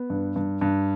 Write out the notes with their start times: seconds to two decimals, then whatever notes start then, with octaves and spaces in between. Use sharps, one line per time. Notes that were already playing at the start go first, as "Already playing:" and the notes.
Already playing: B3
0.10 G2
0.36 G2
0.61 G2